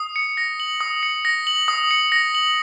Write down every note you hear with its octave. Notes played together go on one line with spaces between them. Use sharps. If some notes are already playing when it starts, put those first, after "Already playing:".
Already playing: D#6
C#7
A#6
F#7
D#6
C#7
A#6
F#7
D#6
C#7
A#6
F#7